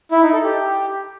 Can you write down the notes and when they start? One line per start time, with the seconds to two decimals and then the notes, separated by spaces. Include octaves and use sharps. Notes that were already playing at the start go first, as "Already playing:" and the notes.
0.11 E4
0.22 D#4
0.33 A4
0.43 G4